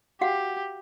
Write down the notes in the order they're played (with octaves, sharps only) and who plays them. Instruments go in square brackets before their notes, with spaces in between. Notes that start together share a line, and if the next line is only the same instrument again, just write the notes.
[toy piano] F#4 F5 F#5 [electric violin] G4